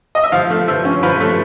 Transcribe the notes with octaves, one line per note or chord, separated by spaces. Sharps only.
D#5
E5
F3 F5
A3
F3 E5
C#4
F3 B4
A3